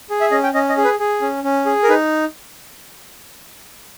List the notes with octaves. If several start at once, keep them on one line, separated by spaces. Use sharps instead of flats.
G#4
E5
C#4 D#5
G5
C#4 D#5
D#5
G#4
B4
G#4
C#4
C#4
G#4
A#4
D#4 B4